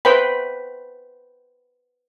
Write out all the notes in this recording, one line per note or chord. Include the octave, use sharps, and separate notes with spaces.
B4 C5 G5 B5